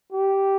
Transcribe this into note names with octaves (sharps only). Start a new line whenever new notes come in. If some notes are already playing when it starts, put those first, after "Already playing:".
G4